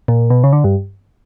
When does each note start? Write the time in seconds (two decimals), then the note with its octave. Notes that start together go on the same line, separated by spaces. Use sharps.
0.08 A#2
0.30 B2
0.44 C#3
0.53 D3
0.64 G2